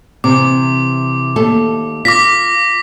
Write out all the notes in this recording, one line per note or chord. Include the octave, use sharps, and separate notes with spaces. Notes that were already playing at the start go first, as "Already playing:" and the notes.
C3 E3 D6
D#2 A3 A4
F4 D6 A#6 B6